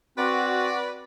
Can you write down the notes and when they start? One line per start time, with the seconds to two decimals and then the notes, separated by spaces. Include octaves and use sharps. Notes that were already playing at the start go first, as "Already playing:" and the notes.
0.18 C4 F#4 B4 D5